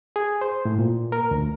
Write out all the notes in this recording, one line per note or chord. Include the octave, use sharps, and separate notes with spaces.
G#4
C5
A2
A#2
A#4
D2